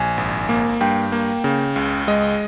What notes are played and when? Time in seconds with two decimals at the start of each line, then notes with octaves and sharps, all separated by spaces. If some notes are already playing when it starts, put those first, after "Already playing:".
Already playing: A#1 G#5
0.18 G#1
0.49 A#3
0.81 G2 G5
1.12 A#3
1.44 C#3
1.76 C#2
2.08 G#3 D#5